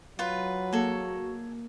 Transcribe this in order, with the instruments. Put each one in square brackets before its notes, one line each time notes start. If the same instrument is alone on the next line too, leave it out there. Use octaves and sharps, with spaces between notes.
[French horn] F#3 [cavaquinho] F4 B4
[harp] A#3 [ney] F#4 [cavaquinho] G#4 A4